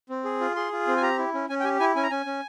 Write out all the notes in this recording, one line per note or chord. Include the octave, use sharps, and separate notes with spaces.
C4
G#4
F4
G#4 C6
F4
C4
G#5
G4 A#5
E4
C#4
C#4 G#5
G5
G4 G#5
E4 G#5
C#4 G#5
A#5
C#4 G#5
C#4